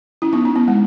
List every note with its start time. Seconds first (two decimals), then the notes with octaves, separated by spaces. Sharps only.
0.22 C#4 E4
0.33 B3 D#4
0.45 C#4
0.55 B3
0.68 G#3